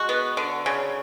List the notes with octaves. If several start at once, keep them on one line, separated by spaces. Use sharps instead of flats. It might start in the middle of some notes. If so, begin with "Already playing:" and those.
Already playing: G#3 F#4
B3
D3
C#3